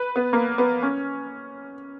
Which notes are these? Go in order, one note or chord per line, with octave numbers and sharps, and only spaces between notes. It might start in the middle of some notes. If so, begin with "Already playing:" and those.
Already playing: B4
B3
A#3
B3
C#4